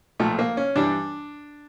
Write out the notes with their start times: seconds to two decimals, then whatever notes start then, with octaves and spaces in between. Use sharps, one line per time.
0.20 B1 A#2 F3 A3
0.39 A#3
0.57 C#4
0.76 G2 E3 G3 D4